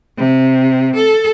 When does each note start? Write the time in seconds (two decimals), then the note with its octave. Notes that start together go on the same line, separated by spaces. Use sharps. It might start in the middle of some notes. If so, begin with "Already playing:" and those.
0.18 C3
0.96 A4